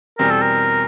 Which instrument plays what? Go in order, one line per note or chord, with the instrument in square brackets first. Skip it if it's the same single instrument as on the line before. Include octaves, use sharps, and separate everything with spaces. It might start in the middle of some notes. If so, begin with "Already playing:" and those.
[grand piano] E2 B2 G3 C4 [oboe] A#4
[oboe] A4
A#4